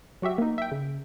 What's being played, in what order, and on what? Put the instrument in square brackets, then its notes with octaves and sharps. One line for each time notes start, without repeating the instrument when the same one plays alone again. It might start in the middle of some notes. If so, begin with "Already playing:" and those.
[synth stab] F#3 F#4 G4 E5
A#3 D#4
E5 G5
C#3